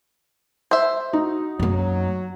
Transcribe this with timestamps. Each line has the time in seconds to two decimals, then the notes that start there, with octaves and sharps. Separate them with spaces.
0.71 C5 E5
1.13 D#4 F#4
1.59 F#2 F#3 A#3